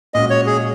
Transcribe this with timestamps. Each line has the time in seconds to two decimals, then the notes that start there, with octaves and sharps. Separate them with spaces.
0.14 A#2 G#3 C#4 F#4 D#5
0.30 C#5
0.46 G#4